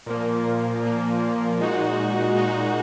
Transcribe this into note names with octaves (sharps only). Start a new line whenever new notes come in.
A#2 F3 A#3
A#2 F3 A#3
A#2 G#3 D#4 F#4
A#2 G#3 D#4 F#4